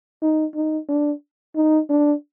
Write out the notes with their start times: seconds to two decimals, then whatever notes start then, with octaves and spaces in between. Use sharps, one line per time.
0.22 D#4
0.55 D#4
0.89 D4
1.56 D#4
1.90 D4